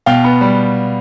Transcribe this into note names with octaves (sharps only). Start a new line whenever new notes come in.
B2 F5 G5
B3
G3